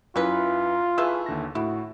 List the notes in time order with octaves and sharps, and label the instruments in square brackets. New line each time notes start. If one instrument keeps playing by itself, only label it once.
[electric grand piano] F#2 E4 [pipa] E3 B4 [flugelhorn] F4
[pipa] E3 A3 E5 [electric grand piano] G#4 B4 E6
[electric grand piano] D#2 D3 A#6
[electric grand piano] A2 [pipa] E4 [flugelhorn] F#4